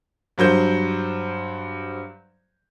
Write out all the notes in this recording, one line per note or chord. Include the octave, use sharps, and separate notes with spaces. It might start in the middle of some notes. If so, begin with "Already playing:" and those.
G2 F#3 C5 G6